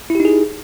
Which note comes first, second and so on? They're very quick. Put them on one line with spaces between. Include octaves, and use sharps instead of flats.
E4 G4 D#4 G#4